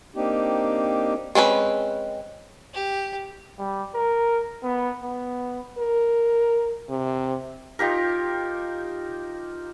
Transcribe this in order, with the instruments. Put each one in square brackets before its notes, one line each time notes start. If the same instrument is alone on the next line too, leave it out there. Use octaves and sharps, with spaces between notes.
[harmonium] A#3 C4 D4 D#4 G4
[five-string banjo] G#3 C4 C#4 B4
[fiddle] G4
[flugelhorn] G3
A#4
B3
B3
[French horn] A#4
C3
[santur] D#4 F4 G4 A#4